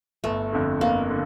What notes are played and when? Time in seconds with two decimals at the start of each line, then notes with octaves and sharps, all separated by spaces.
0.24 G1 A3
0.52 F2 D3
0.81 G1 A#3
1.10 D3